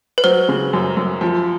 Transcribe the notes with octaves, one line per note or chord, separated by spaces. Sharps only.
B4
F#3 C5
C#3
F#2
F#2
F3